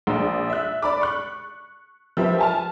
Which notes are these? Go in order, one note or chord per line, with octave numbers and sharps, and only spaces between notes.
A#1
E5 F#6
D5 B5 D6
C#6 F#6
F3 G4 A#4 B4 E5
G#5 A5 F6